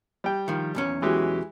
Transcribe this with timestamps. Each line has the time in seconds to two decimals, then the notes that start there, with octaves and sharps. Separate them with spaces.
0.24 G3 G5
0.48 D#3 F3
0.75 B1 E2 C#4
1.02 E3 G#3 F#4 G4